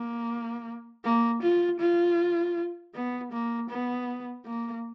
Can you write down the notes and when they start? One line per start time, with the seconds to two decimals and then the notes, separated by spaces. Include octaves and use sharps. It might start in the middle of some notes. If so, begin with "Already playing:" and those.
Already playing: A#3
1.05 A#3
1.43 F4
1.80 F4
2.95 B3
3.33 A#3
3.70 B3
4.46 A#3